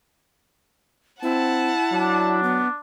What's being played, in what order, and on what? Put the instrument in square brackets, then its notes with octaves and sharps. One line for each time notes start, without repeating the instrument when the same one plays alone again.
[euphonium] C4 [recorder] E4 [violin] F#5 A5
[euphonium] F#3 [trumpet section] D4
[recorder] B3